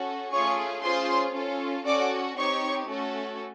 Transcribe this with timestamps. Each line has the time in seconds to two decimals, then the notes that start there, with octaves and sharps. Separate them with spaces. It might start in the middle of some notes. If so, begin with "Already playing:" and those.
Already playing: C#4 F#4 A4
0.32 A3 C#4 F4 G#4 C#5 C#6
0.84 C#4 F4 G#4 C5 C6
1.35 C#4 F4 A4
1.86 C#4 F#4 A4 D5 D6
2.37 C4 D#4 G4 C#5 C#6
2.88 A3 C#4 F#4 A4